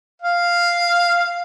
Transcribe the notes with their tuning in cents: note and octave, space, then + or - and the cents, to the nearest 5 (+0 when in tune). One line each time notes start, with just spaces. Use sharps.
F5 -5